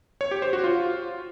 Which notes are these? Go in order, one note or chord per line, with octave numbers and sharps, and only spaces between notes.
C#5
G4
C5
F#4
F4